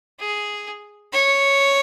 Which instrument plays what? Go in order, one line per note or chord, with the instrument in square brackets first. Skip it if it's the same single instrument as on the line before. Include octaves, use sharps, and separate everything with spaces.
[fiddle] G#4
C#5